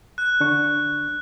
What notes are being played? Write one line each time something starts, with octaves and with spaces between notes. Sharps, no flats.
F#6
D3 D4 C#6